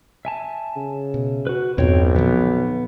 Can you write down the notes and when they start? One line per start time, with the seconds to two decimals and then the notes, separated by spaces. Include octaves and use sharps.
0.25 E5 G#5 A5
0.77 C#3
1.14 B2
1.47 F#4 B4
1.78 B1 E2 G2 A#2 C4 C#5 G5
2.16 A#2 D3 F3 B3